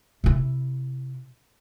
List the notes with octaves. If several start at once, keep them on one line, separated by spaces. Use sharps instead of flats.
C3 E4